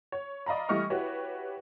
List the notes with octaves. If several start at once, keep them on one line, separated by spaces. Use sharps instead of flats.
C#5
D5 D#5 F5 A#5 B5
E3 G3 A3 D#5 C#6 F6
E4 F#4 G4 B4 C#5